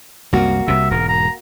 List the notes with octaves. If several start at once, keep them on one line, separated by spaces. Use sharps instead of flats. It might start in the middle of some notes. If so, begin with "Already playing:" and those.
C2 F#2 A#3 F#4
C2 C3 E5
E1 G#2 A#4
A#5